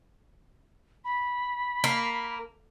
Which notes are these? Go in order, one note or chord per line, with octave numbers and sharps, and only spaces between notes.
B5
A#3